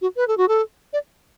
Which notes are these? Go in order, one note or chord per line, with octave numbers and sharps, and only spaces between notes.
F#4
B4
A4
F#4
A4
D5